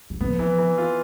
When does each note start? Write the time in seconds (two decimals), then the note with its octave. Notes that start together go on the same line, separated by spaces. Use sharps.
0.10 E3
0.21 F3 B3
0.39 E3
0.58 E3
0.78 F4